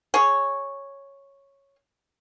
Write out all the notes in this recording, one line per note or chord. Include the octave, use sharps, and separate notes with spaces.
G#4 C#5